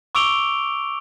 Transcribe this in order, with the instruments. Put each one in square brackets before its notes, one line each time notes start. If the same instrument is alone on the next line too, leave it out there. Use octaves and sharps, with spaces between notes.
[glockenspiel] C#6 D6 E6 D7 F7 G7